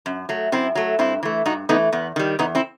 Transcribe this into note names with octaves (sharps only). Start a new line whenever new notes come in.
F#2
F#3 A3
F#2 C4 E4
F#3 A3
G2 C4 E4
E3 A3
G2 D#4 F#4
E3 A3 B3 D#4
E2 B3
D#3 G3
E2 B3 D#4
C4 E4